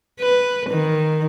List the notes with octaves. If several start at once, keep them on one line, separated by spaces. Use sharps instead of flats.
B4
D#3